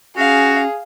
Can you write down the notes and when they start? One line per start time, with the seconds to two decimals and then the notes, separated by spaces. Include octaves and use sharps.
0.17 C#4 F#4 G#4 F5